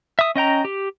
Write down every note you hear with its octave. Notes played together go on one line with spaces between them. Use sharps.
E5 D#6
C#4 D#5 G5 A#5
G4